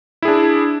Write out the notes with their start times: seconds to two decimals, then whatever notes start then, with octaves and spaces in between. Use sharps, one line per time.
0.22 E4
0.25 G#4
0.28 D4